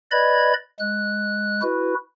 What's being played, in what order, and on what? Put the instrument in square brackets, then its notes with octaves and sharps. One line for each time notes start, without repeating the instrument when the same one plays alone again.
[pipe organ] B4 D5 D#5 B5 G#6
G#3 F#6
E4 F#4 B4